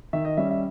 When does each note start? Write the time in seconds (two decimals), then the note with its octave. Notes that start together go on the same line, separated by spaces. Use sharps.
0.13 D#3 E5
0.25 D#5
0.37 G3 C#4 E5
0.51 E5